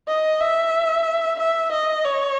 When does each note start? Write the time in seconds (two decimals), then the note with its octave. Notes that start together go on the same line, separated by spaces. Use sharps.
0.08 D#5
0.41 E5
1.40 E5
1.72 D#5
2.05 C#5